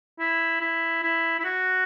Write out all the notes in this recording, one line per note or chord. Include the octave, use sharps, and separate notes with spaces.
E4
E4
E4
E4
F#4